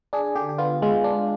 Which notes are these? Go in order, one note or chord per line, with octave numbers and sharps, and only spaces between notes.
D4 G#4
D3 G4
G4
B3 F4
G#3 F4
D4